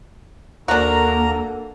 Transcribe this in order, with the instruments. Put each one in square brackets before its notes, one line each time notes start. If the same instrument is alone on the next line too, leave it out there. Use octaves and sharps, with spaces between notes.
[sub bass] D#2 [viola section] D3 A#3 A4 [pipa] D4 F#4 [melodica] A#4 A#5